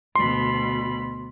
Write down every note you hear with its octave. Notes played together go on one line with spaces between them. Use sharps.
D2 B2 B5 C6